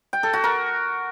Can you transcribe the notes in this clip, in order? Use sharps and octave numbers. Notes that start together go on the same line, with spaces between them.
G5
A4
F#4
A#4